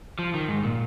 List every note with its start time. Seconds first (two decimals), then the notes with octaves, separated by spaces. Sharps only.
0.19 F3
0.34 D#3
0.48 G#2
0.63 A#2